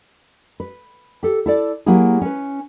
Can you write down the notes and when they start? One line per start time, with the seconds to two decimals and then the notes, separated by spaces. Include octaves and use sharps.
0.60 B4
1.23 G4 A4
1.46 E4 A4 D5
1.86 F#3 A#3 E4 G4 G#4
2.21 C#4 B4